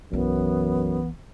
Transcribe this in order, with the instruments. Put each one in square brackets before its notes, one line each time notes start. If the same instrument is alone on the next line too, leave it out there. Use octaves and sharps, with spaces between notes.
[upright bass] B1 E3 [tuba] F#2 [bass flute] B3